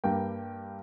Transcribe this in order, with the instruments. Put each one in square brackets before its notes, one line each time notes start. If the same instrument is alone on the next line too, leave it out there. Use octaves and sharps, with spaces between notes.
[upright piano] G2 G3 A#3 G5